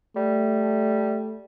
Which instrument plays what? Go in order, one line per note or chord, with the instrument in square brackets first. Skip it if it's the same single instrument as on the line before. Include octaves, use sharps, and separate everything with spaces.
[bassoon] G3 [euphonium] A3